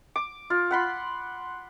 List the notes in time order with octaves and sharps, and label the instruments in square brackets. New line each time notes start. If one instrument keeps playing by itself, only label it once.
[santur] D6
F4
F#5 B5 C6